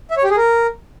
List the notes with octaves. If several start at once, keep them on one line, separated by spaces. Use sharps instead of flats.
E5
C#5
G4
G#4
A#4